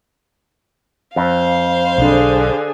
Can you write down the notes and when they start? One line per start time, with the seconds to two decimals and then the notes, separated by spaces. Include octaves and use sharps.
1.16 F2 C5 F5
1.98 B1 D3 D4 G#4